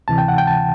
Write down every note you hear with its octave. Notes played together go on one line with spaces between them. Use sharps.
D2 C3 E3 A5
G5
F#5
G5
A5